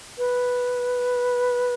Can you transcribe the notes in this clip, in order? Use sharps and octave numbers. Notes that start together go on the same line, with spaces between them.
B4